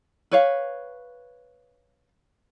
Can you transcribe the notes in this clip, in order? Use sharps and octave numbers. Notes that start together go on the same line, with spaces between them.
B4 C#5 F5